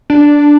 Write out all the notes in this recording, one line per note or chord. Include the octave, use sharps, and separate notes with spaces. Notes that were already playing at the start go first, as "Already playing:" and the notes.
D4